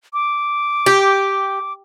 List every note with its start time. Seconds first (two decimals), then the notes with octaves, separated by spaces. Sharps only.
0.13 D6
0.86 G4